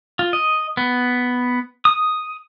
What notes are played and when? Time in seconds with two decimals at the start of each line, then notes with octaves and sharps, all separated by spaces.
0.19 F4
0.33 D#5
0.77 B3
1.85 D#6